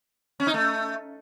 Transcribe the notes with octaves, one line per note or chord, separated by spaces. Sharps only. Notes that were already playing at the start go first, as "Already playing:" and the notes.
C#4
D#4
A3